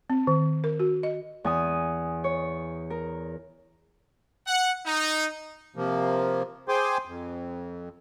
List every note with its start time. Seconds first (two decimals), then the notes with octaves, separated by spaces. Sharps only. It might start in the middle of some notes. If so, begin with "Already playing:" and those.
0.10 C4
0.27 D#3
0.64 A#4
0.80 F#4
1.03 D#5
1.44 E2 G#5 D#6
2.24 C#5
2.90 A#4
4.47 F#5
4.86 D#4
5.76 C3 F3 A#3
6.69 G#4 C5 G5 G#5 C6 D6
7.05 F2